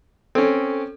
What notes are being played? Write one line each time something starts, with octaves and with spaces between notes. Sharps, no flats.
C4 C#4 A4